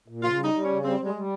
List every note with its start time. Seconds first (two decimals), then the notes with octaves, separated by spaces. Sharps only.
0.08 A#2
0.23 C#3 F4
0.38 G3
0.44 D#4
0.53 G3
0.64 C#3 C#4
0.84 G3 C4
1.00 G3 G#3
1.14 G3